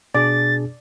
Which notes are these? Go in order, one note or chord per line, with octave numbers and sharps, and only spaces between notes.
B2 D4 G#4 D5 A6